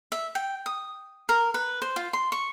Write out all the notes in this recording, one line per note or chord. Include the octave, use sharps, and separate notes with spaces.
E5
G5
D#6
A#4
B4
C5
F4
C6
C#6